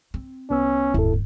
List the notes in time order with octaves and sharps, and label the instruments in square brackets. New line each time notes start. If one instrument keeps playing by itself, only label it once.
[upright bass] C4
[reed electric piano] C2 B3 E6 [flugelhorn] C#4
[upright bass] D1 G1 [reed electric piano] E4 A4